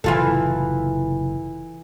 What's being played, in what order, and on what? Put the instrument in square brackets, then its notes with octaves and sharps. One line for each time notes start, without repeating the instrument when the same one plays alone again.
[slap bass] F#1 A2 C3 [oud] E3 F4 A4